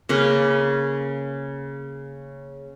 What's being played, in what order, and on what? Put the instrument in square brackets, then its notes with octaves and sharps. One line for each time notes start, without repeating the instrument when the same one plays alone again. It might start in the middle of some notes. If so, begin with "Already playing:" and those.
[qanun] C#3 A#3 B4